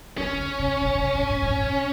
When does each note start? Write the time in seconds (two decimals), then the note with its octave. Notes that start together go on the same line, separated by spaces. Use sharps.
0.18 D#3 C#4
0.33 D3
0.59 C3
0.81 C3
0.95 A#2
1.01 B2
1.15 A2
1.30 A2
1.42 A2
1.63 B2